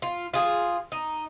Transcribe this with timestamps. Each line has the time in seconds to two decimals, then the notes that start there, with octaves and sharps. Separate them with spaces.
0.02 F4
0.34 F4 G#4
0.92 D#4